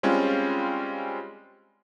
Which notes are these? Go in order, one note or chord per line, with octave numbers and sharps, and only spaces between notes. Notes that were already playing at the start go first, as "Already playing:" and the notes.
G3 G#3 C4 C#4 F4